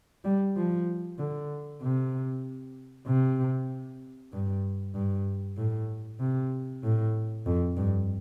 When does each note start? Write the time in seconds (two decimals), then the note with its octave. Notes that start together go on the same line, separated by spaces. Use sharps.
0.25 G3
0.56 F3
1.19 D3
1.82 C3
3.07 C3
4.33 G2
4.94 G2
5.57 A2
6.20 C3
6.84 A2
7.46 F2
7.77 G2